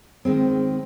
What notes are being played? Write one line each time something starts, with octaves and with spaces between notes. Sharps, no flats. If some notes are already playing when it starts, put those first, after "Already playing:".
D#3 G#3 C4